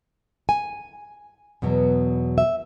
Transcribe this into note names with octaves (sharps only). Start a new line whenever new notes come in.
G#5
E2 B2 F#3 B3
E5